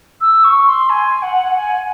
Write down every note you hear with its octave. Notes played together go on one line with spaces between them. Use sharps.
E6
C#6
C6
G#5
F#5
G#5
G#5